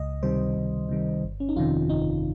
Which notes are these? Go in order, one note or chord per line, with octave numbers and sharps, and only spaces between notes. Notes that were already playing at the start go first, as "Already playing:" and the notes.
Already playing: C#2 D#5
C3 D#3 G3 C5
C#2
C3 D#3 G3
G1
C#4
D#4
F2 C3 D#3 F4
G1 D#4